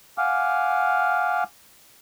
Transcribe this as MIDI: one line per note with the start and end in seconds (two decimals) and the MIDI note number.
0.18 1.44 77
0.18 1.44 78
0.18 1.44 80
0.18 1.44 86
0.18 1.44 89